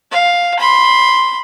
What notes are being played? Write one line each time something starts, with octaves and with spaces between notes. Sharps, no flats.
F5
B5 C6